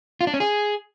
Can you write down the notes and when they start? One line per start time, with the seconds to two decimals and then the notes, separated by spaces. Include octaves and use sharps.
0.21 F4
0.27 D4
0.34 C#4
0.40 G#4